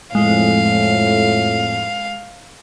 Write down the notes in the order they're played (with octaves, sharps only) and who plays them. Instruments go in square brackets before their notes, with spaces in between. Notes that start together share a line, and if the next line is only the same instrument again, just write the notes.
[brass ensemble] F2 A2 [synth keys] G#3 [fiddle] F5